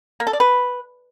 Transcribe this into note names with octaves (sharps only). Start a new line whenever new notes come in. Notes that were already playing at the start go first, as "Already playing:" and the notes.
A#3
A4
D5
B4